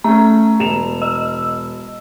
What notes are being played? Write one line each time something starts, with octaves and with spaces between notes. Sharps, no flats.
A3 C#4 A#5
E1 E7 F7
D#5 E6